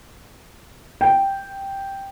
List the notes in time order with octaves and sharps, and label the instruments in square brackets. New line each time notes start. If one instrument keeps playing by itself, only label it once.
[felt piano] G5